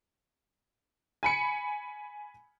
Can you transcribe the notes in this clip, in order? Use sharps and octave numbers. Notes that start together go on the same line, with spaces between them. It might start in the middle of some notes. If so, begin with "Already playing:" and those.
G#5 B5 C#7